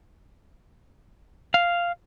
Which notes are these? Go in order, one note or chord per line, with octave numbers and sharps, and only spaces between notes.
F5